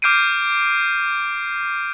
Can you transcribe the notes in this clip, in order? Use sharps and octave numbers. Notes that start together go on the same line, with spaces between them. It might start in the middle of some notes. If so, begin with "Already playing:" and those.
D6 F6 G6 C7 D7 D#7